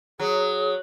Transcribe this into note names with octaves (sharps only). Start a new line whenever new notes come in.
F#3 G#4